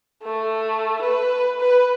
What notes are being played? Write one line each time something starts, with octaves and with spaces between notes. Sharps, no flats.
A3
B4
B4